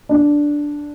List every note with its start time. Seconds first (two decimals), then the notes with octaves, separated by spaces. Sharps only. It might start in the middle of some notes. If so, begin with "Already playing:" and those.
0.09 D4